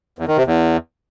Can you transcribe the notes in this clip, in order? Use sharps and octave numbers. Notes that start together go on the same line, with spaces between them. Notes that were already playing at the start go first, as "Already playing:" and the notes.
E2
D#3
C3
E2